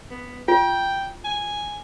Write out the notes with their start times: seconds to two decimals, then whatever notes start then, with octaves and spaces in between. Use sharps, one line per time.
0.11 B3
0.48 F4 G5
1.25 G#5